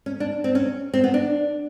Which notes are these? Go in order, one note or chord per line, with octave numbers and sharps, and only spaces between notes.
C#4
D4
C4
C#4
C4
B3
D4